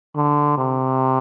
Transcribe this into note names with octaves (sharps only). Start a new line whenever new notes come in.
D3
C3